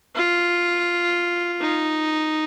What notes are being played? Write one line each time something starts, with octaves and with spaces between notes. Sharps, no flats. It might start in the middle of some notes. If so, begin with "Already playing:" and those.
F4
D#4